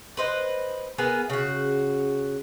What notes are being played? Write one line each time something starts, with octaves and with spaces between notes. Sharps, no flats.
B4 C5 D#5
B3 G#4 A#4
C#3 F#4